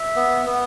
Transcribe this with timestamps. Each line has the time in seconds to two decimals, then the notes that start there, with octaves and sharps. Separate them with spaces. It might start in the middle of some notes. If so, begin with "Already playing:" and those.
Already playing: E5
0.16 B3
0.46 B3